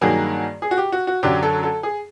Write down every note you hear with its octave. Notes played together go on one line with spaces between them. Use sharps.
G2 D#3 F#3 A#3 G#4
G#4
F#4
G4
F#4
F#4
F#2 D3 F#3 G4
A4
A4
G#4